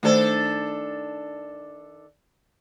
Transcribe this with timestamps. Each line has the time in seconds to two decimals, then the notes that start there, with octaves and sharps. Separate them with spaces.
0.03 D#3 A3 D4 A4 C5